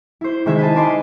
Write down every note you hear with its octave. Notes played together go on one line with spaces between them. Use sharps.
E4 C5
C3 D#3 G#3 E5 G#6
B4 D#5 A5
A#4 B4 D5 D#5 G#5 C6